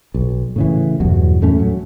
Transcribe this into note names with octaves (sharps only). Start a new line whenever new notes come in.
B1
A2 C#3 E3
E2 G2 B2 F#3
E2 A2 A3 C#4
F#3